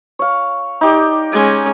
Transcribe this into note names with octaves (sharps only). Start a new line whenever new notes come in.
C#5 F5
D#4 G4 D5
G#3 C#4